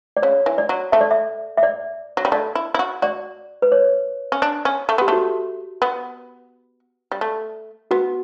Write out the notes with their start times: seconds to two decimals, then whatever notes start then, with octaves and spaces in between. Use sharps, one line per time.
0.17 D5
0.22 C#3 C#5
0.46 E3
0.58 D5
0.69 F#3
0.92 A3 E5
1.01 D5
1.11 E5
1.57 E5
1.63 D5
2.17 F#3
2.25 G3
2.32 A3 D5
2.55 E4
2.74 E4
2.79 F#4
3.02 F#4 D5
3.62 B4
3.72 C#5
4.32 C#4
4.42 D4
4.65 C#4
4.89 A3
4.98 B3 G4
5.08 A3 F#4
5.82 B3
7.12 G3
7.21 A3
7.91 B3 F#4